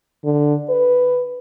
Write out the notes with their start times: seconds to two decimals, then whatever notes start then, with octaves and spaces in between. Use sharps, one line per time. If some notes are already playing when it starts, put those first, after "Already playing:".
0.24 D3
0.69 B4